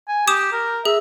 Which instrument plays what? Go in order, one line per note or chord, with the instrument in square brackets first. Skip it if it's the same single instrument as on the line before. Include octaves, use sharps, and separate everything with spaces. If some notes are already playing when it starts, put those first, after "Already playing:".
[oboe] G#5
[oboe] G4 [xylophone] D6 D#6 E7
[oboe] A#4
[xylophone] G#4 [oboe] E5